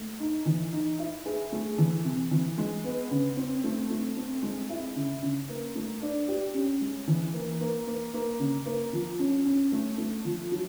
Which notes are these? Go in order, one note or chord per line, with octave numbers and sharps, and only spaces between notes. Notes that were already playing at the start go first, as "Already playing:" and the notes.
Already playing: A3
D#4
E3
D#4
E4
G#4
A3
E3
C3
E3
G#3
B3
C#3
C4
A3
A3
C4
G#3
E4
C#3
C#3
A#3
A3
D4
G4
C#4
G#3
E3
A#3
A#3
A#3
A#3
C#3
A#3
F3
C#4
C#4
A3
A3
F3
F#3